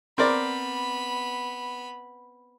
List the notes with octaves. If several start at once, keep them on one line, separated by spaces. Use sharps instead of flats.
B3 C4 A#4 D5 B5